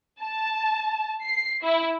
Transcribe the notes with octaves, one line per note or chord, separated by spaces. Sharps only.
A5
C7
E4